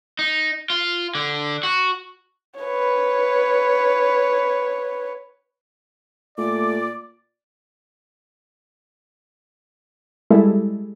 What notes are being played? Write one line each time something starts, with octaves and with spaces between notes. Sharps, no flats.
D#4
F4
D3
F#4
B4 C#5
A#2 A3 D5 D6
G3 G#3 E4 A4